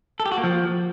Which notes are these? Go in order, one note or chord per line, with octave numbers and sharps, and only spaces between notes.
A4
G4
F#4
A#3
F3